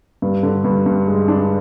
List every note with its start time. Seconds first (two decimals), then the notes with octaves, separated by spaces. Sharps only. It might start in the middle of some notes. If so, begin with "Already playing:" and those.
0.22 G2
0.43 D3
0.65 G2
0.86 G2
1.07 G#3
1.28 D4